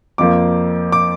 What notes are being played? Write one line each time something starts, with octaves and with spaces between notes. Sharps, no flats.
F2 F3 A#3 D6
D6